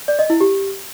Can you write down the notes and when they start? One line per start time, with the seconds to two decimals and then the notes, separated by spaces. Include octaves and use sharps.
0.08 D5
0.19 D#5
0.30 E4
0.41 G4